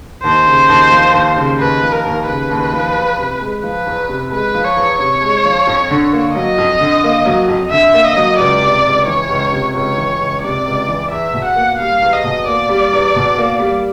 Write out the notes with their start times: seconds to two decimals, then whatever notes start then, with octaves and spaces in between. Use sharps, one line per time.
0.23 D#2 C5
0.46 C#3
0.69 D#2
0.92 F3
1.13 D#2
1.37 C#3
1.59 D#2 B4
1.82 F3
1.93 A#4
2.05 D#2
2.27 C#3 B4
2.50 D#2
2.72 F3
2.95 E2
3.17 C3
3.40 G#3
3.63 F3 B4
3.86 E2
4.08 C3
4.30 G#3 B4
4.54 F3
4.65 C#5
4.76 E2
4.99 C3 C#5
5.21 G#3
5.44 F3
5.67 F2
5.90 D3
6.12 A#3
6.35 F#3 D#5
6.58 F2
6.80 D3
7.04 A#3
7.25 F#3
7.48 F2
7.71 D3 E5
7.94 A#3
8.05 D#5
8.16 F#3
8.39 C#2 D5
8.62 C3
8.85 C#2
9.07 E3 C#5
9.29 C#2
9.52 C3
9.75 C#2 C#5
9.97 E3
10.20 C#2
10.43 C3 D5
10.65 C#2
10.88 E3
11.11 E2 E5
11.33 B2
11.45 F#5
11.56 A#3
11.79 G3 F5
12.02 E2
12.13 D#5
12.24 B2
12.47 A#3 D5
12.69 G3
12.93 E2
13.15 B2
13.38 A#3
13.59 G3